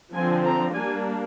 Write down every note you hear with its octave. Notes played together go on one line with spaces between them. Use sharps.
D3 F3 C4 G#5
A#5
G3 A#3 D4 G#5